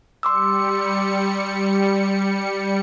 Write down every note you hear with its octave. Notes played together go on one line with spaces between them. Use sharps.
G3 C6 D6 E6 C#7